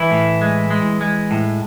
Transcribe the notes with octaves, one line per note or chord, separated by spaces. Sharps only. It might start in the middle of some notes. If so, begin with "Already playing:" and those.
Already playing: E3 E4
A2
G#3
G#3
G#3
A2